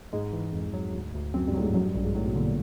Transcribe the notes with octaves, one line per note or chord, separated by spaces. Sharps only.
G#2 G#3
E3
F2
F#3
D2
D2
F#2 C4
G2
A2 F#3
G#2
F#2 F#3
G2
A#1 G2
G#2
A2 F#3
B2
A#2 D3
A#2